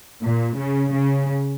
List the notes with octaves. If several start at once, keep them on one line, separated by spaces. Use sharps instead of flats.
A#2
C#3
C#3